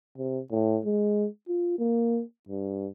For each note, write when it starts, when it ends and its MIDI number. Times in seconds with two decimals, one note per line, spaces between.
0.18 0.40 48
0.51 0.80 45
0.85 1.27 56
1.48 1.74 65
1.78 2.22 58
2.49 2.88 43